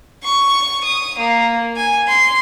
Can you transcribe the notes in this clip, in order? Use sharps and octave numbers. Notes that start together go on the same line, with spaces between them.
C#6
D#6
A#3
G#5
C6